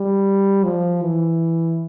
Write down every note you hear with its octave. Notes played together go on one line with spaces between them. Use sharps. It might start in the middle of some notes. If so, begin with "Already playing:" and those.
Already playing: G3
F3
E3